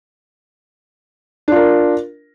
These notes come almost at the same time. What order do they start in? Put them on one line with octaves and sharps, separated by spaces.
D4 F4 A#4